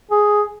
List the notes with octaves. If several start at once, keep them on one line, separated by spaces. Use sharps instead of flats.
G#4